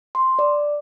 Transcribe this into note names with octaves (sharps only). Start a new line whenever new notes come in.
C6
D5